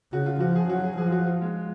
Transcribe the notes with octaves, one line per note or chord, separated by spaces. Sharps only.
C#3 F#4
F4
F3 F#4
G#4
F#3 F#4
G#4
F3 G#4
F4
F#4
F4
G#3